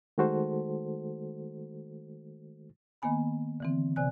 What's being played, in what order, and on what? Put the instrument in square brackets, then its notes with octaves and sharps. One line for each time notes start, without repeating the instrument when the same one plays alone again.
[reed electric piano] D#3 G#3 A3 F#4 A4 C5
[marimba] D#3 A#3 B3 G#5 B5
D3 E3 C4
C3 D5 G#5 F#6